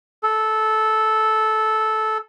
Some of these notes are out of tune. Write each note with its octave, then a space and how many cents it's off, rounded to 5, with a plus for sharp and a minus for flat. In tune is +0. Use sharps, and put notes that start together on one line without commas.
A4 -10